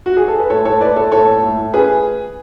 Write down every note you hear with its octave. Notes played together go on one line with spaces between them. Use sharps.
F#4
G#4
A4
B4
A2 A4 C#5
A2 A4 C#5
A2 B4 D5
B3 A4 C#5
A2 A4 C#5
A2
A2
A2
C#4 G#4 B4